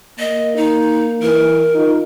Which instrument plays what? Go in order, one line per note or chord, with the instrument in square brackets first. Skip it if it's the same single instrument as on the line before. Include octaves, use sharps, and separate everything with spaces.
[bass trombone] A#3 [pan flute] D#5
[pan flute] D#4
[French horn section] E3 [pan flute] A#4
[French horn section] D#4 F4